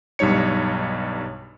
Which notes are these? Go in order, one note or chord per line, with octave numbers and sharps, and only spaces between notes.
B1 G2 G3 D#4 C#5 C#7